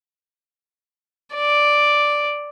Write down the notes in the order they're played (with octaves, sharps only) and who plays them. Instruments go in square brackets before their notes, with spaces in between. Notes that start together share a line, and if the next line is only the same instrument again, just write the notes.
[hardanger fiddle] D5